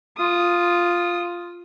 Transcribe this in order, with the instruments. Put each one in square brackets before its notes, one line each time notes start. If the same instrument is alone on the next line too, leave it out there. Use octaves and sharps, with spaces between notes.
[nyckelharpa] F4 D#6